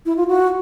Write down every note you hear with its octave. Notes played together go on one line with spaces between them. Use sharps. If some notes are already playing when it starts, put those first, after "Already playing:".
E4
F4
F#4